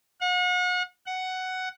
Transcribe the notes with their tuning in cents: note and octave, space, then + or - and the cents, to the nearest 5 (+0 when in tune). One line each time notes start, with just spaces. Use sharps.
F#5 -40
F#5 +10